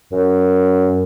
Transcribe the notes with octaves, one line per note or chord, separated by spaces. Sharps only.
F#2